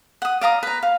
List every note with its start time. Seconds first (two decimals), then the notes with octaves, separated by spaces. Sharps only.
0.22 F#5 D#6
0.41 D5 F5 A#5 D#6
0.63 B4 A#5
0.83 F5